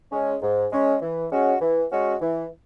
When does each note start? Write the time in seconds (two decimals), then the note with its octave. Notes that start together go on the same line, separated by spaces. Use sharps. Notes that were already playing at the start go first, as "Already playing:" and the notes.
0.11 G#3 C#4
0.42 G#2
0.72 G#3 C#4
1.02 E3
1.31 G#3 C#4 F#4
1.61 E3
1.91 G#3 C#4 F#4
2.21 E3